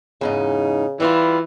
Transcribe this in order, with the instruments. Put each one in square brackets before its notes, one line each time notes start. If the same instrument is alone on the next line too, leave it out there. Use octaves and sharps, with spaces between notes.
[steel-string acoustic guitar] E2 G#2 D#4 [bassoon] C#3
[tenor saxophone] E3 [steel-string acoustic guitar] G3 E4 F4